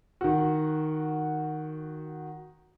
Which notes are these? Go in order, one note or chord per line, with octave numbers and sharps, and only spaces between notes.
D#3 F#4